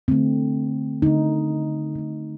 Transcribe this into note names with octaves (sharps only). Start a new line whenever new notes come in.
D3 A3 C4
D3 A3 D#4
D3 A3